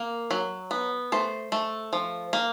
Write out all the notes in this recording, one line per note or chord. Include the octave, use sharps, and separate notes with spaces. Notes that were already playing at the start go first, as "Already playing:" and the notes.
Already playing: A#3
F#3
B3
A3 C5
A3
F3
A#3